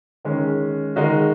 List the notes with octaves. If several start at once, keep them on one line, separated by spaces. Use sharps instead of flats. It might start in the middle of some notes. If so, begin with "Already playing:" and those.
D#3 G#3 C#4
D#3 G#3 D#4 F#4